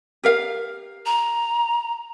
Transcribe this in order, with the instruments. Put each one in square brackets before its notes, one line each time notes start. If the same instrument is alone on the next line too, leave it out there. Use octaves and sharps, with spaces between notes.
[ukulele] G4 A#4 F5
[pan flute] A#5